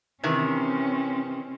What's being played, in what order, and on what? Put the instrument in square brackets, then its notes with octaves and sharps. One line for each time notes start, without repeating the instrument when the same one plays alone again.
[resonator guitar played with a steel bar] C3 D#3 E3 [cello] C4 C#4